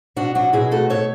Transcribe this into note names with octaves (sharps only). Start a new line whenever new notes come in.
B2 D4 F#4
F#3 D4 F#4
B2 E4 G#4
A3 F#4 A4
B2 A4 C#5